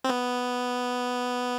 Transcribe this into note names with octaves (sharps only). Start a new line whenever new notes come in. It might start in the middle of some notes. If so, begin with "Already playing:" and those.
C4
B3